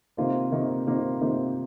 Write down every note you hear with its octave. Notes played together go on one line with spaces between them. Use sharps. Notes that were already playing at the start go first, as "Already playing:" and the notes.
C3 D#3 A#3 F4 C5
C3 D#3 A#3 F4 C5
C3 D#3 A#3 F4 C5
C3 D#3 A#3 F4 C5